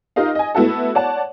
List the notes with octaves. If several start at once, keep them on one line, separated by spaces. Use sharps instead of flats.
D#4 F4 G4 A#4 D#5 F5
D#5 G#5
A3 B3 E4 F#4 A4
C#5 D5 F#5 A5